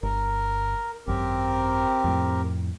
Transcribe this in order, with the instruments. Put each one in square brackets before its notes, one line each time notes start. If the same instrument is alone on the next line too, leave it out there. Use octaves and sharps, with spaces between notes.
[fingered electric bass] G1 [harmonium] A#4
[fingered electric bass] G#1 F#2 [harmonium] C4 G4 A#4
[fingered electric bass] F2 A2